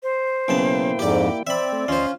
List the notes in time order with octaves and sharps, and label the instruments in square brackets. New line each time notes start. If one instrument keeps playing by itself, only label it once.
[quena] C5
[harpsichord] B1 C#3 A5 [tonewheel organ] A#3 E4 G5
[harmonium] F2 G#2 [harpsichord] G4 D5
[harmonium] C4 [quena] D5 [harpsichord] E5 B5
[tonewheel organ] A3
[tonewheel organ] D2 D#5 F5 [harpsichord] C#4 C5 [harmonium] F4